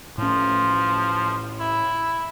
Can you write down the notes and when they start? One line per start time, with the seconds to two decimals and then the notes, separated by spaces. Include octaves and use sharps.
0.18 A2 F3 C#4
1.60 E4